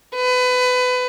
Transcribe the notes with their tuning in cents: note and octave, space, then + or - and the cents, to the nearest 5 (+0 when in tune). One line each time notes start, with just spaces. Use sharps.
B4 +25